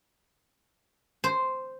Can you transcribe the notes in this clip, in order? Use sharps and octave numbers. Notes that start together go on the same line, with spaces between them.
C5